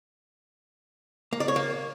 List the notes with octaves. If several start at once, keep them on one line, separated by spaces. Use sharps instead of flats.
A#3
D5
C#5
A#3